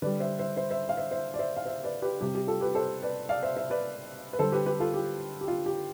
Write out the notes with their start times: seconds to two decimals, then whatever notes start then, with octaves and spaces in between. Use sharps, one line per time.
0.02 D3 G3 B4 D5
0.20 C5 E5
0.39 C5 E5
0.56 C5 E5
0.71 C5 E5
0.89 F5
0.97 C5 E5
1.11 C5 E5
1.34 D5
1.39 C5 E5
1.56 F5
1.66 C5 E5
1.84 B4 D5
2.02 G4 B4
2.20 C3 G3 G4
2.35 G4
2.47 F4 A4
2.61 G4 B4
2.75 A4 C5
3.02 B4 D5
3.29 D5 F5
3.43 C5 E5
3.57 C5 E5
3.70 B4 D5
4.33 B4
4.39 D3 G3 A4 C5
4.52 G4 B4
4.66 G4 B4
4.80 F4 A4
4.94 G4
5.41 G4
5.48 F4
5.66 G4